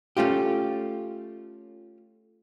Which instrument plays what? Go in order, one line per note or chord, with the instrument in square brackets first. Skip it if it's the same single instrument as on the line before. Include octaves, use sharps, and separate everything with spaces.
[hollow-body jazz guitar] A3 C#4 F4 G4